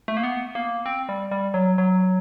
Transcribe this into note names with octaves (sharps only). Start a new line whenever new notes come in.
A3
A#3
B3
A#3
C4
G3
G3
F#3
F#3